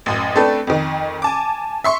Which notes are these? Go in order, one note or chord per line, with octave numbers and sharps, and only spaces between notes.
A1 F#2 D#6
A3 C4 D4 A4 B4
F2 D#3
G#5 A5 D6
E5 C6 C#6